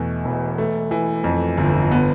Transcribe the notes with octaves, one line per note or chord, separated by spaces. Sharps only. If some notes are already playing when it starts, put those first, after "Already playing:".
Already playing: E2 B2 A3
E1
A3
E3
F2
G1
B3